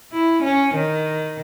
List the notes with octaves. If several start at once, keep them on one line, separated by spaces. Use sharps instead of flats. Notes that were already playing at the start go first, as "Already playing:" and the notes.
E4
C#4
D#3